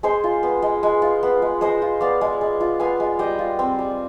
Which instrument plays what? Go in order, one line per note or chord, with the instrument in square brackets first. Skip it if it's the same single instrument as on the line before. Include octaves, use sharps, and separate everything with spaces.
[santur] G#3 G#4 C5
F4
B3
G#3
G#3
F4
B3
G#3
G#3 C5 D#5
F4
B3 D5 F5
G#3
G#3
F4
B3 F5 G#5
G#3
G3 D#5 G5
F4
C4
G3